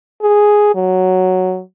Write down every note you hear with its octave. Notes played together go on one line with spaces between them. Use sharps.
G#4
F#3